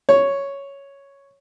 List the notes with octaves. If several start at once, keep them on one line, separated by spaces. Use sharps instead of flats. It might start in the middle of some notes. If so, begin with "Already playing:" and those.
C#5